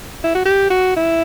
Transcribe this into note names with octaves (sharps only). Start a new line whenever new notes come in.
E4
F#4
G4
F#4
E4